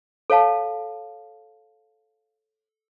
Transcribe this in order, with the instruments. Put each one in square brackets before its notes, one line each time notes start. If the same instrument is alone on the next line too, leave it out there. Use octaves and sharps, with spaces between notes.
[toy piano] A4 C#5 F5 A5